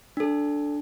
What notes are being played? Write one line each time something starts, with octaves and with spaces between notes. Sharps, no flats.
D4 A4